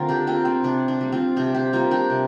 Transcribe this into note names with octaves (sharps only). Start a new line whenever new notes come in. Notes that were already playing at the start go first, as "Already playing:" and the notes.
Already playing: D3 A#3 C4 F4 A#4
D4 G4
A#3 C4 F4
C4
C3 D4
D4
G3 A#3
C4 F4
C3 D4 G4
G4 C5
G3 A#3 F4 A#4
D4 G4
C3